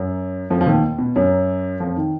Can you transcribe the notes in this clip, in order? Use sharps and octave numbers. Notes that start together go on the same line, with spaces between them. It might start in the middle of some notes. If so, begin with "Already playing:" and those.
Already playing: F#2 F#3
F2 F3
F3
D#2 D#3
B2
F#2 F#3
F2 F3
D#3